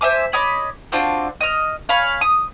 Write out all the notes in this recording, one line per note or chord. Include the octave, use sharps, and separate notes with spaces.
C5 E5 G#5 D6
C#5 D#5 B5 D6
C4 D4 F4 F#4
D#5 F6
C#5 F5 G#5 B5
D#6